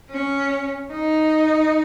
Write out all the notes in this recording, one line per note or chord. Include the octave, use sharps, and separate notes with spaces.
C#4
D#4